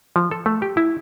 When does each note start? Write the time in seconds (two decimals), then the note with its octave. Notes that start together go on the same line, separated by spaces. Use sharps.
0.16 F3
0.31 A4
0.46 A3
0.62 G4
0.77 E4